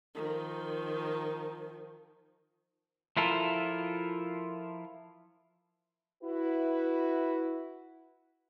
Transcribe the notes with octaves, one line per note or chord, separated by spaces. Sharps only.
D#3 F3
F3 E4 F4 A4 A#4
E4 F#4 B4